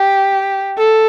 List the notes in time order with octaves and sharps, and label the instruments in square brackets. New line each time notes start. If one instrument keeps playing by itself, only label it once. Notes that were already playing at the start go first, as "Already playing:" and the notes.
Already playing: [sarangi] G4
A4